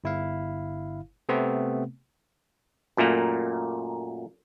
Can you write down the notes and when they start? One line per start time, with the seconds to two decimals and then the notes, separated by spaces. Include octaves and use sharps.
0.04 G1 E4 F5
1.29 C3 A3 B3 C4
2.97 F#2 A#2 A3 A#3